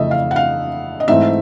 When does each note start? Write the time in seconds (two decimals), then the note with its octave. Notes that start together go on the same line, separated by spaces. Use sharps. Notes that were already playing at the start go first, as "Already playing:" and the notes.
Already playing: F2 C#3 E3 A3 D#5 E5
0.11 F5
0.31 F#5
0.36 F5
1.00 D#5
1.08 G#2 E3 A3 C4 E5